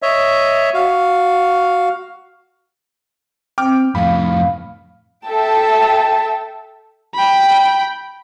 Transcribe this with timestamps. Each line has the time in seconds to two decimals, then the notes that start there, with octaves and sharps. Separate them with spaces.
0.02 C#5 D#5 E5
0.74 F#4 F5
3.58 C4 G5 D6 F6
3.95 F2 A2 F5 B5
5.28 A4 E5 G5 A5
7.15 G5 B5